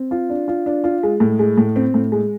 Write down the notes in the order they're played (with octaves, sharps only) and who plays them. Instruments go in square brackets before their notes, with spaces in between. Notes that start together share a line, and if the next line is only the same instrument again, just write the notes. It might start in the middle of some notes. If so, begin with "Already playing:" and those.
Already playing: [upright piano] C4
F4
D4
F4
D4
F4
G#3
A2
G#3
A2
C4
A2
G#3